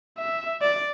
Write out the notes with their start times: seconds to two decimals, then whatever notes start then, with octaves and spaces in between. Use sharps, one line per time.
0.18 E5
0.62 D5